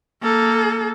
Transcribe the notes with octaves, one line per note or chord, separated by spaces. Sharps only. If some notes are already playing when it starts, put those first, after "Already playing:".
A#3 A4